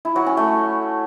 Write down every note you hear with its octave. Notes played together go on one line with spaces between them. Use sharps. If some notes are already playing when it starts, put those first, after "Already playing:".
E4
F#3
C#4
A3